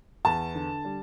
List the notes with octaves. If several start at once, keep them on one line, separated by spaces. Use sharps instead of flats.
E2 A5
D3
G3